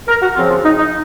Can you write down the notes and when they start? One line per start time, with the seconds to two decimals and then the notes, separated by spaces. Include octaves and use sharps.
0.08 A#4
0.22 F#4
0.36 C#3 F3 C4 F4
0.51 F4
0.65 D#4
0.79 D#4